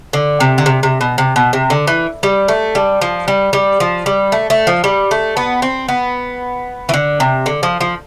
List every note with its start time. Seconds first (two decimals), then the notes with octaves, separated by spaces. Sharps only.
0.13 D3
0.40 C3
0.58 D3
0.66 C3
0.83 C3
1.01 B2
1.18 C3
1.36 B2
1.53 C3
1.70 D3
1.87 E3
2.23 G3
2.48 A3
2.75 G3
3.01 F3
3.28 G3
3.53 G3
3.80 F3
4.06 G3
4.32 A3
4.50 A3
4.67 F3
4.84 G3
5.11 A3
5.37 B3
5.62 C4
5.89 B3
6.89 E3
6.94 D3
7.20 C3
7.46 D3
7.63 F3
7.81 F3